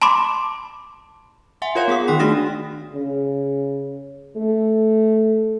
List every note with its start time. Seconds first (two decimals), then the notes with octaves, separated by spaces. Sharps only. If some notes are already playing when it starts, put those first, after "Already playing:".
0.02 A5 B5 C6 D6
1.62 E5 F#5 G#5 C6
1.75 F4 A#4 C#5 F5 C6 G6
1.88 B3 G#4 F#5 D#6
2.08 D#3 D#4 G5 C6 B6
2.19 A3 D4 F#4 D#6 A#6 E7
2.93 C#3
4.37 A3